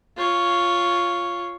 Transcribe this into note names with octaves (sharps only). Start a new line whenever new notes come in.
F4 C#5